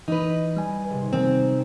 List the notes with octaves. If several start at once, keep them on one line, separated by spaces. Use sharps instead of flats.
E3 D#4 B4
G3 G#5
G#1 C3
D#3 C4